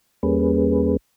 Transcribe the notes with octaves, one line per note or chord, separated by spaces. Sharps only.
E2 G3 A#3 C#4 G#4 B4